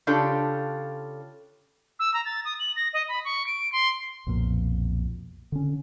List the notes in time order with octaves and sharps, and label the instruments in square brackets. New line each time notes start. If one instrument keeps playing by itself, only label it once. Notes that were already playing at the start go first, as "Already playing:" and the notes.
[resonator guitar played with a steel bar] C#3 D4 F4 G4 A4
[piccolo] E6
A#5
A6
D#6
F#7
A#6
D#5
B5
C#6
D7
C6
[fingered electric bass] B1 F2 A#2
D3 C#4